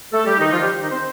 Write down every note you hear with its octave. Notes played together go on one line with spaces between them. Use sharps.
A3 A4
G3 G4
D#3 D#4
F3 F4
G3 G4
D#3 D#4
C4 C5